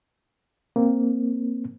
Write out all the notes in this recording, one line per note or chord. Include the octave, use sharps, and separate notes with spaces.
A#3 C4